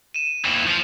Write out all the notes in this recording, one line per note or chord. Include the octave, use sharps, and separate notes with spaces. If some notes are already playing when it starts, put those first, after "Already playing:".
D#7 E7
D#2 E3
F3